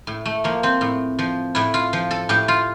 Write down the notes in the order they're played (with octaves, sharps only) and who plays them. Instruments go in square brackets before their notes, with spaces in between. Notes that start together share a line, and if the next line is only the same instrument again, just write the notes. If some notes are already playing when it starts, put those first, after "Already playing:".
[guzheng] A2
A3
F3 A#3
C4
A2
F3
A2 E4
F4
F3
A4
A2 G4
F4